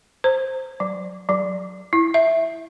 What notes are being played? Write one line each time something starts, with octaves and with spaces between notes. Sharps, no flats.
C5
F#3
F#3
E4
E5